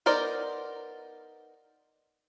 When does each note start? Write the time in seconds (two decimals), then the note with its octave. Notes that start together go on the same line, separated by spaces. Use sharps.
0.06 B3 D#4 A#4 C5 D5